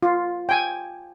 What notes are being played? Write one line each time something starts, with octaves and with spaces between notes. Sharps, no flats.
F4
G5 G#5